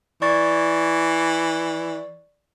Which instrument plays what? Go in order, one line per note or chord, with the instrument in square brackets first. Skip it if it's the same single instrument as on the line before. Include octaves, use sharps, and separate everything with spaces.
[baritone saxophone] E3 [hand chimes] D5 C#6 A6